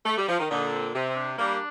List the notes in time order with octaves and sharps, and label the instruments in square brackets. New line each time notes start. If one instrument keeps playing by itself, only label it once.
[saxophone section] A3
G3
F3
D#3
[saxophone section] A#2 D3 [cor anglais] D#4
[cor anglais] C4
[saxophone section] C3 [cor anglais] C4
[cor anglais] C4
D4
[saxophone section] G3 A#3 [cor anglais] D4